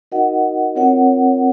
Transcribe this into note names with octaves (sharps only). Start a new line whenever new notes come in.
D#4 F#4 A#4 D#5 F#5
C4 F4 A#4 C#5 F#5